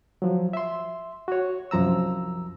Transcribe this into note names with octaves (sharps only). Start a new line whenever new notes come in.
F3 F#3
E5 C6
F#4 C#5
C2 F#2 F3 A#5 E6